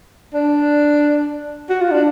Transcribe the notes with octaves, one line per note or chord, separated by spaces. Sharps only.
D4
F#4
F4
D4